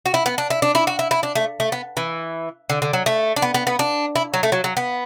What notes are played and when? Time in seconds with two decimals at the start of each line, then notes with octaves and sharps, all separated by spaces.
0.06 F#4
0.14 E4
0.26 B3
0.38 D4
0.50 E4
0.62 D4
0.75 E4
0.87 F#4
0.99 E4
1.11 E4
1.23 D4
1.35 A3
1.60 A3
1.72 B3
1.97 E3
2.70 D3
2.82 D3
2.93 F#3
3.06 A3
3.36 D4
3.42 B3
3.54 B3
3.67 B3
3.79 D4
4.15 E4
4.34 F#3
4.43 A3
4.52 F#3
4.64 F#3
4.77 B3